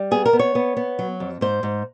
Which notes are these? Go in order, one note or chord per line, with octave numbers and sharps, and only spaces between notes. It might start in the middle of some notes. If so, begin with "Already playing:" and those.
Already playing: G3
B3 G#4
A#4
B3
C#5
B3
B3
F#3
F2
G#2 C5
G#2